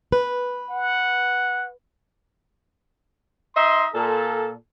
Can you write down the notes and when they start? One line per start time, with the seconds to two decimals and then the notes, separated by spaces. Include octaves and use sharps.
0.12 B4
0.70 F#5
3.56 D#4 D#5 E5 C6
3.94 A#2 A4